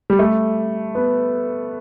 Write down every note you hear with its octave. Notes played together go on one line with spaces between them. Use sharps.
G3
A3
B3